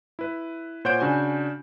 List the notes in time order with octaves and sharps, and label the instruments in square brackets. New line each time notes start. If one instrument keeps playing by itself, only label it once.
[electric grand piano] E4 B4
A#2 C5 C#5 F#5 G6 D7
C#3 D4 F#4 G#5